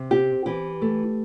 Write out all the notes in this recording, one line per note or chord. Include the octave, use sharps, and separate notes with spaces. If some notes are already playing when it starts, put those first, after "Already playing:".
Already playing: C3
C4 G4
E3 G4
A3